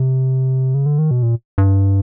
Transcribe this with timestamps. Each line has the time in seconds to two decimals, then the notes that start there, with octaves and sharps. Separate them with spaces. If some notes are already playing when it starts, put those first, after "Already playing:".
Already playing: C3
0.75 C#3
0.86 D3
0.99 D#3
1.11 B2
1.23 A#2
1.58 G2